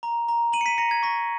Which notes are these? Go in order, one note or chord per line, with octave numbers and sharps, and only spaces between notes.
A#5
A#5
A#5 D#7 F#7
C#7
B6 D#7
A#5 A#6 C#7
G#6
C#6 A#6